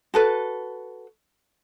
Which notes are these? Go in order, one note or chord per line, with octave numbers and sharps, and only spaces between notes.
F#4 A4 B4